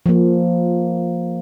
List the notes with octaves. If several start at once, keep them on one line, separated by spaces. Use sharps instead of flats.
F3 A#3